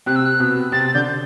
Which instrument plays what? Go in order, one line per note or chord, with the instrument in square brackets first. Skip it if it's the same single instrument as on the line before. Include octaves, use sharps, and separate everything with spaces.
[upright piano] C3 C4 [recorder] F#6
[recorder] E6
F#6
[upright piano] B2 B3
[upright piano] C3 C4 [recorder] A6
[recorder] A6
[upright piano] D3 D4 [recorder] G6